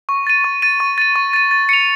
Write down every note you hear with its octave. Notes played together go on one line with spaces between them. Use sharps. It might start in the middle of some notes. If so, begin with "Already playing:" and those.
C#6
A6 D#7
C#6
A6 D#7
C#6
A6 D#7
C#6
A6 D#7
A6
C#7 F7